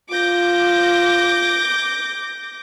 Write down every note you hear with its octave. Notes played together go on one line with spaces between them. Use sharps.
F4 D6 G6 A#6